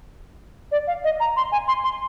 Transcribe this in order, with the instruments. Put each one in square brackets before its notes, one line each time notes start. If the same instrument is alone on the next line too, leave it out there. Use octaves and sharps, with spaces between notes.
[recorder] D5
F5
D#5
A#5
C6
G#5
C6
C6